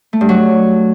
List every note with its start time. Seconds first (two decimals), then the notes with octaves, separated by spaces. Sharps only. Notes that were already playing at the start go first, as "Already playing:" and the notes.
0.13 A3
0.21 G2
0.29 F#3